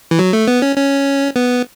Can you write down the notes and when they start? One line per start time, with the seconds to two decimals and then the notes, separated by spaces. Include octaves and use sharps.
0.11 E3
0.19 F#3
0.33 A3
0.48 B3
0.62 C#4
0.77 C#4
1.36 B3